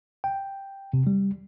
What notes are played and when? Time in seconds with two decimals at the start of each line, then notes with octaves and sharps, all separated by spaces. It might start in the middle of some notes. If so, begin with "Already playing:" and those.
0.24 G5
0.93 C3
1.07 G3